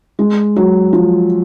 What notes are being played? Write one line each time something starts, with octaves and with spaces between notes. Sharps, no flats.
G#3
F#3
F3